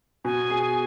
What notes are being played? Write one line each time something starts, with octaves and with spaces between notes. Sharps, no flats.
B2 G#5
G#4